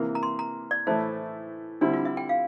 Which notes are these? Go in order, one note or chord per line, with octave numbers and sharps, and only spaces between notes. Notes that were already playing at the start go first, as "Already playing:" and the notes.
Already playing: C3 E3 A#3
A#5
C6
A#5
D5
A2 E3 A3 E4 C5
D3 G3 C4 D4 E4
F4
E5
G5
F5